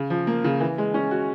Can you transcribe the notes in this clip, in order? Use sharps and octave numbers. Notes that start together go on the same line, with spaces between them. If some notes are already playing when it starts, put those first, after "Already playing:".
Already playing: C#3
F3
A#3
C#3
E3
G#3
C#4
F#4